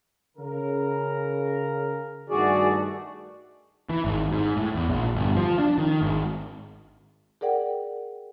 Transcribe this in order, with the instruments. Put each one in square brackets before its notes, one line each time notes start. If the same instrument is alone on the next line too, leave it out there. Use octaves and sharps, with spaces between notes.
[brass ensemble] C#3 A#4
[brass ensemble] G2 D#3 A3 [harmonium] F#4 G#4 D5
[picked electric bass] E3
G#1
G#2
A2
E2
A#1
G1
F3
D4
D#3
G#1
[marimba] G#4 A#4 D5 F#5 G5